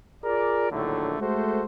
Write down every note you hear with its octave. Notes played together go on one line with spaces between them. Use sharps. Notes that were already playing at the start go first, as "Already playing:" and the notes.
F4 G#4 A#4 D5
A#1 A2 D3 D#3 F#3 A3
G#3 A3 F#4 A4 C5